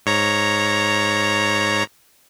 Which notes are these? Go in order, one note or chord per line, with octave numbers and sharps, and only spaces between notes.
G#2 C#5 A#5